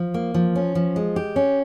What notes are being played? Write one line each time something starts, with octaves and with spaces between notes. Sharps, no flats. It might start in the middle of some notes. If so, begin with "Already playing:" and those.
Already playing: F3
A#3
F3
C#4
F3
G#3
G4
C#4